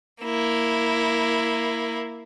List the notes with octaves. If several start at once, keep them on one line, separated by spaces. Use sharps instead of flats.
A#3 E4